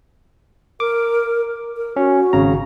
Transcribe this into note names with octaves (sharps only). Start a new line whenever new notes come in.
A#4 D6
A#4
C#4 F#4
G#1 C#3 A#5